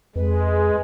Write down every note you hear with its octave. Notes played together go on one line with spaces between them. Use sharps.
F2 G#3 B4